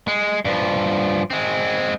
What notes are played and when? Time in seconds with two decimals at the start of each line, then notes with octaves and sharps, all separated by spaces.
0.08 G#3
0.45 G2 F3
1.30 G#3 C4